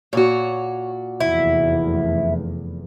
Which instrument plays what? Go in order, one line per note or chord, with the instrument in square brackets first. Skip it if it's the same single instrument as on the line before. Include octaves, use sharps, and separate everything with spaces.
[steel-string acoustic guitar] A#2 F#4 [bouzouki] C#5
[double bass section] F1 E2 [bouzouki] E4